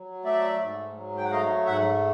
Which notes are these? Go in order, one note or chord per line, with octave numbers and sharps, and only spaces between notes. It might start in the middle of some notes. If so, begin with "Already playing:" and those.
Already playing: F#3
A3 D5 E5
G#2
F#3
G5
F#5
A3 D#5 F5
G#2 E5 F#5